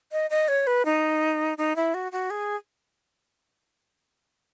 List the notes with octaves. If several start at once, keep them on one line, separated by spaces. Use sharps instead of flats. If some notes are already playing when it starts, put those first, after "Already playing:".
D#5
D#5
C#5
B4
D#4
D#4
E4
F#4
F#4
G#4